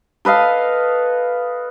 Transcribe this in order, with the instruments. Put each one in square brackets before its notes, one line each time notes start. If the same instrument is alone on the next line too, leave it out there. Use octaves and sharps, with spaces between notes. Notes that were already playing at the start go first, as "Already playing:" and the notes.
[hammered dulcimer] A4 B4 D#5 F5